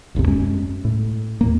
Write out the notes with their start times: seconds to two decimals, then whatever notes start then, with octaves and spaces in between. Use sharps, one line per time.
0.15 D1 G#1 D#2 C3
0.28 F#2 G#3 C#4
0.85 A2
1.41 D#2 A2 A#3